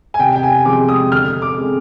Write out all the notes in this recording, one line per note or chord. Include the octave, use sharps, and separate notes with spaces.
G#5
C3 G5
G5
G#5
F3 G#3 C4 D6
D#6
D3 F6
D6
G#3 C4